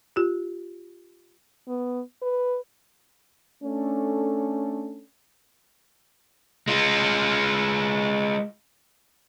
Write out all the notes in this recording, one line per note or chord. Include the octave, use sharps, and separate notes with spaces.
F4 G4
B3
B4
A3 C#4 D4 A4
G#3 F4